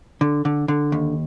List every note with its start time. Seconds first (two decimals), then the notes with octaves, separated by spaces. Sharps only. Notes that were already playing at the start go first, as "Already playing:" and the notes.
0.21 D3
0.45 D3
0.68 D3
0.92 D#2